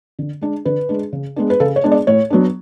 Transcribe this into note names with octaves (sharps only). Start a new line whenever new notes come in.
D3
G#3 D4
D3 B4
G#3 D4
C#3
G#3 B3 D4
B4
C#3 A4
C#5
G#3 B3 D4
D5
A2 C#5
F#3 B3 D4